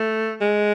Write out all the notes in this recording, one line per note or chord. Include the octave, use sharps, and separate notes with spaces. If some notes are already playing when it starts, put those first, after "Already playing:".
Already playing: A3
G#3